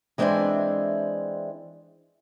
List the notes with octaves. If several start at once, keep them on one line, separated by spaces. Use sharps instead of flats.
E3 G#3 C4 D4 E5 G#5